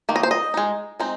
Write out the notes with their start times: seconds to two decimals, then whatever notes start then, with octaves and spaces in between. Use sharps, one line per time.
0.09 D#3 A#3
0.16 D#5
0.23 C5
0.31 D#5
0.54 G#3 D#4
1.00 G#3 C4 D#4